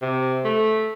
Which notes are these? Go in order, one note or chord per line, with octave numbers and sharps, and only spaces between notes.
C3
A3